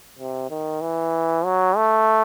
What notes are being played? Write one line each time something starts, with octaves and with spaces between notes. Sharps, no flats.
C3
D#3
E3
F#3
A3